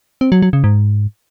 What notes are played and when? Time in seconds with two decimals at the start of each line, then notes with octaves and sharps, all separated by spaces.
0.21 C4
0.32 F#3
0.42 F#3
0.53 C#3
0.64 G#2